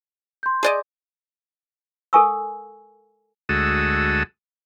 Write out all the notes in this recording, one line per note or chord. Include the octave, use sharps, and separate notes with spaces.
C6 G6
G#4 D5 D#5
A4 A#4 F5 G#5 C#6 E6
D2 G#3 F#4 A4 D#6 E6